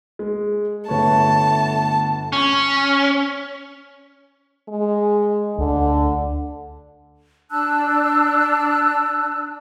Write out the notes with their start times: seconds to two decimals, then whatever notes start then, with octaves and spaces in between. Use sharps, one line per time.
0.19 G#3
0.88 G1 A3 B4 C#5 A5
2.33 C#4
4.69 G#3
5.59 D2 D3
7.51 D4 A5 E6 F#6